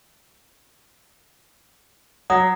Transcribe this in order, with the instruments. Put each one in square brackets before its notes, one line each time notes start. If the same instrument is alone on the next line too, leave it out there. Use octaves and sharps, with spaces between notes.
[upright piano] F#3 [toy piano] F#5 D#6